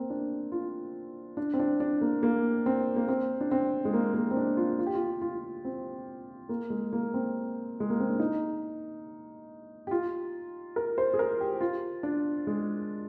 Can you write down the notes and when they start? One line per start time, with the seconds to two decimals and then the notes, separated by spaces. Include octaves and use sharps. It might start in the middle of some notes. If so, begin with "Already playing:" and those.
Already playing: A#3 C4
0.10 D4
0.52 F4
1.37 D4
1.54 C4
1.59 D4
1.80 D4
2.01 A#3
2.23 A#3
2.66 C4
2.96 A#3
3.09 C4
3.41 D4
3.51 C4
3.85 G#3
3.94 A#3
4.14 A#3
4.31 C4
4.37 D4
4.57 F4
4.79 F4
4.86 G4
4.95 F4
5.21 F4
5.65 C4
6.49 A#3
6.70 G#3
6.93 A#3
7.14 C4
7.80 G#3
7.90 A#3
8.00 C4
8.09 D4
8.20 D#4
9.87 G4
9.91 F4
10.76 A#4
10.98 C5
11.14 G#4
11.19 A#4
11.40 G4
11.61 F4
12.03 D4
12.47 G#3